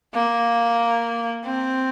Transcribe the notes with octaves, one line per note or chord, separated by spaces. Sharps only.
A#3
C4